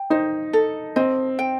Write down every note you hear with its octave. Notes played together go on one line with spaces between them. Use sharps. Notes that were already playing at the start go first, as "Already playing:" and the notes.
Already playing: G5
D#4 C5
A4
C4 D#5
G5